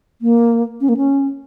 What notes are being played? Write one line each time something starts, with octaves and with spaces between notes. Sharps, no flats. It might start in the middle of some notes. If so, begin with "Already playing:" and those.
A#3
C#4
A#3
C#4